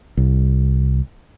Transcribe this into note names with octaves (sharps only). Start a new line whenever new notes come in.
C2